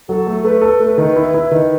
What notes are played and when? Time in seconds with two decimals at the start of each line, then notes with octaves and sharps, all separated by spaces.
0.08 F#3 A4
0.27 A3
0.44 A3 B4
0.61 A4
0.80 A3
0.98 D#3
1.16 E4
1.34 E4
1.51 D#3